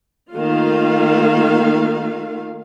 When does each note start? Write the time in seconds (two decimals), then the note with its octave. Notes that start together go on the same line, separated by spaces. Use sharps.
0.32 D#3 A3 A#3 F4 F5